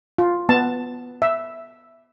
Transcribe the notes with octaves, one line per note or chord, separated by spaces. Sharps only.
F4
B3 A5
E5